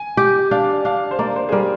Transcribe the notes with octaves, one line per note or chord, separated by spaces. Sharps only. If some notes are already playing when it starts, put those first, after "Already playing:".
Already playing: G#5
G4
D4 F5
D4 F5
C5
A#3 D5
C5
G#4
G3 A#4